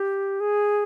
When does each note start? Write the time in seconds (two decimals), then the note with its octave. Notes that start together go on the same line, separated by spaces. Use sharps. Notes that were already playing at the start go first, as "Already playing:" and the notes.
Already playing: G4
0.40 G#4